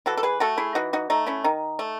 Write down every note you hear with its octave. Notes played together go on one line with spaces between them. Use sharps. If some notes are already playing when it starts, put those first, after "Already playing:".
E3 F#4 A4
A4
G#4 B4
A3 F#4 A4
E4 G#4
E3 D#4 F#4
D#4 F#4
A3 D#4
C#4 E4
D#3 D#4
A3